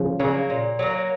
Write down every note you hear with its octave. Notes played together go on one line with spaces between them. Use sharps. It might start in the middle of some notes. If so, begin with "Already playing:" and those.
Already playing: C#3 F3
C#3 F#3 A#3
A#2
F#3 A#3